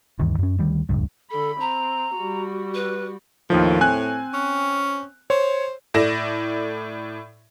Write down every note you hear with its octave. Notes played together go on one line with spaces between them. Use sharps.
D2 G2 D#3 E3
F#2 C#4
D2 D#3 G3
D#1 G#1 C#2 G2
D3 A4 B5
C4 A#5
G3 F#4
B4
D#2 A2 D#3 F3
C4 G#5 F#6
C#4
C5 C#5
A2 A4 D5 A#6 E7